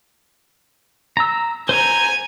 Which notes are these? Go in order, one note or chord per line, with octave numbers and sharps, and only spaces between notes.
A#5 E6
C5 G#5 A#5